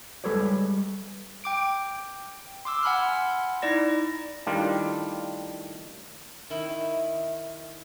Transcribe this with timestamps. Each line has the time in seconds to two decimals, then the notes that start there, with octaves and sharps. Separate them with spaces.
0.24 G3 G#3 A4 B4 C#5 D5
1.44 G5 D6 D7
2.65 C6 D6 E6
2.83 F#5 G#5 B5 C6 F6
3.62 D#4 E4 D5 A#6
4.46 A2 D#3 G3 D4 F4
6.50 D#3 E4